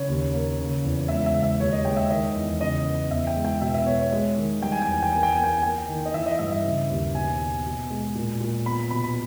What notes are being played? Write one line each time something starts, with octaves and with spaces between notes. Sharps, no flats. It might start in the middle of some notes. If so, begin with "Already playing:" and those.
Already playing: C#3 C#5
D#2
A#3
C#3
E2
C#2 E5
E5
C#2
E5
D#2 C#5
D#5
G#3 G5
E5
D#3 D#5
E2
C#3 D#5
B3
E2 E5
G5
G#3
G5
B2 E5
E5
B3 C#5
C#5
G#3
D#3
G3 G5
G#5
G5
E2 G#5
G5
A#3 G#5
G5
G#5
A#3
G5
G#5
A#3 G5
D#3
D#5
E3 E5
D#5
G2 E5
E5
C#3
D#2
B2 G#5
B2
B2
G#3
A#2
A#2
B3 B5
B2 B5
B5